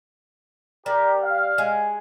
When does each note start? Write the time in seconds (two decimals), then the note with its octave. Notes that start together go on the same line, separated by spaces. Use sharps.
0.86 G3 G4 A#4
1.23 F5
1.58 G#3